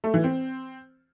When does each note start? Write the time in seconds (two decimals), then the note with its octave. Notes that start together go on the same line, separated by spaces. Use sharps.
0.04 A3
0.14 E3
0.24 C4